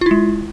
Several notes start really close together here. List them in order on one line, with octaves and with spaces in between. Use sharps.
F4 E4 G#3